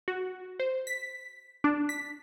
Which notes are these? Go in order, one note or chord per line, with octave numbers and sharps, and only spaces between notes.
F#4
C5
B6
D4
B6